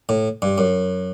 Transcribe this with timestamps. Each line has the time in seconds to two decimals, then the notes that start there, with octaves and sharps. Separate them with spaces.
0.09 A2
0.42 G2
0.58 F#2